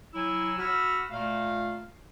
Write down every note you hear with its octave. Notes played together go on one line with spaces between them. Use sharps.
F#3 E4 G#5 E6
F#4 F#5 B5 E6 F6
A#2 A3 F4 F5